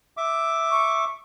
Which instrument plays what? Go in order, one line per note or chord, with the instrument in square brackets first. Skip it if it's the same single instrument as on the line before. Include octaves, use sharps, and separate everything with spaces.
[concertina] E5 D6
[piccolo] C#6